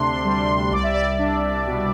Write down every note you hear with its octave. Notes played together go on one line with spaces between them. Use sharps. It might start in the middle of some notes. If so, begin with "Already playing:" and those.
Already playing: D2 C3 D4 C6
G3
C2 D5
E5
D5
D4
B2